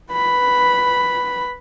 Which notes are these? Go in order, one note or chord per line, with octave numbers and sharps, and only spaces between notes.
B4 B5